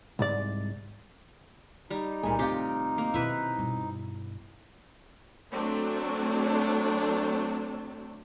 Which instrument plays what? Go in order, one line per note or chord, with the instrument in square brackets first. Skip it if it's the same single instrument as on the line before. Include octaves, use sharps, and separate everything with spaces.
[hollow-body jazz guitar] C2 G#2 D5
[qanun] G3 [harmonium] D#4
[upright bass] C2 [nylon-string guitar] A#2 G3 G#4
[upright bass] D#2 A2 [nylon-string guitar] C3 F4 [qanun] G4
[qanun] A#3
[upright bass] B2 D#3 [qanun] E4 B4
[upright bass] G2 B2
[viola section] F#3 A3 C4 D4